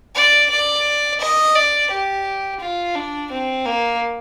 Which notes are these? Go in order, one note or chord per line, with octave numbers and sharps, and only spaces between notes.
D5
D5
D#5
D5
G4
F4
D4
C4
A#3